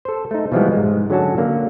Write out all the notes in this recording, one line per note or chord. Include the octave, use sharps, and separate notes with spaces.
A4 C5
A3 D#4
B2 E3 F3 G3 G#3 B3
G#2 G#3
D3 F#3 C#4 F#4 A5
D3 A#3